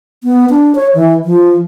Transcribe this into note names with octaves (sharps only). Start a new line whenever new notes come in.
B3
D4
C#5
E3
F3